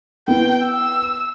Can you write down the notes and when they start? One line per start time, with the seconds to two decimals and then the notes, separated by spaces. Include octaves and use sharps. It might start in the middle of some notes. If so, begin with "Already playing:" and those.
0.28 B3 E4 G5
0.65 E6